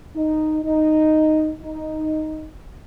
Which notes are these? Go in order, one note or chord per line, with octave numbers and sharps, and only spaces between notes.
D#4
D#4
D#4